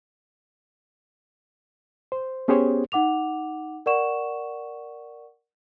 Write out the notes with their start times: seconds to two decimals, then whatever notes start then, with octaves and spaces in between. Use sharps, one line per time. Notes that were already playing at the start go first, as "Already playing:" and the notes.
2.12 C5
2.48 B3 C#4 G4 G#4 C5 C#5
2.92 D#4 F#5 D6 F7
3.86 A#4 D5 F#5 C#6 E7